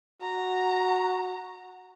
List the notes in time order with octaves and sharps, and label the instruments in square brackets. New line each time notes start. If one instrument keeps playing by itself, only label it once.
[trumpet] F#4 [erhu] A#5